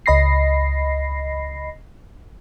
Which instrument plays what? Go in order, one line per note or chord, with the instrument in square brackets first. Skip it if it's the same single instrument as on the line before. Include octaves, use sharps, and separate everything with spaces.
[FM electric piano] C#2 D#5 B5 A#6 C7